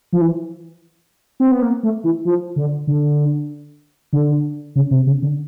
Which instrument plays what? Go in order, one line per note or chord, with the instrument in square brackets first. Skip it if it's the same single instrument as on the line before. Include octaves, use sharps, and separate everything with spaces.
[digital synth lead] F3
E3
C4
B3
A#3
A3
E3
F3
D3
D3
D3
C#3
C3
C#3
D3